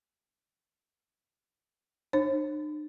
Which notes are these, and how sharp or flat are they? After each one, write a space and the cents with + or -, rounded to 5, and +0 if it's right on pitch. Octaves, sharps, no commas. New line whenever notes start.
D4 +45 C5 +40